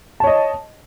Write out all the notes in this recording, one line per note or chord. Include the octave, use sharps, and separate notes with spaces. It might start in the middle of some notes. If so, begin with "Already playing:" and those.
C#5 D#5 A5